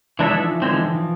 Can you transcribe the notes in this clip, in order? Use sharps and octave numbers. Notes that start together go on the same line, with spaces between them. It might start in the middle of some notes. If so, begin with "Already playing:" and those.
E3 F3 G#3 D4 A4 E5
F3
E3
E3
D3 E3 G#3 C4
E3
F3
F3